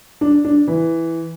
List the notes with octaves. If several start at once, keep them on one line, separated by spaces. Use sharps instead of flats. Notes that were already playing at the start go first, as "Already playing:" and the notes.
D4
D4
E3